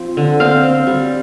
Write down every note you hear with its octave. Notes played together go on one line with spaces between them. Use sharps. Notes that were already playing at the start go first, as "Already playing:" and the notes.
Already playing: F3 C4
D3
C4 F5
C4
G3